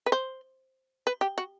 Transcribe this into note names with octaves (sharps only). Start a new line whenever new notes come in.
B4
C5
B4
G4
F#4